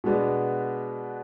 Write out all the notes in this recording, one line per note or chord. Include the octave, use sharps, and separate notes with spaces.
B2 G#3 B3 D4